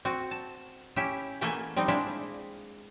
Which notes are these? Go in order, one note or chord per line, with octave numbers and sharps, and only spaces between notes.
C4 F#4
A5
C#4 E4 G4
B2 E3 A3 A#3 A4 G#5
G3 C4 D#4
G#3 D4 E4 F4